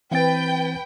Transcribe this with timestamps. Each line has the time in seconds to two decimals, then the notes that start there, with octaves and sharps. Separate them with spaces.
0.11 E3 C4 B4 G5 A6